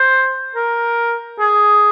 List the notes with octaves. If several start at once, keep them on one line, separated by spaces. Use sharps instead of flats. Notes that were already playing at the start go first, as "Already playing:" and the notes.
Already playing: C5
A#4
G#4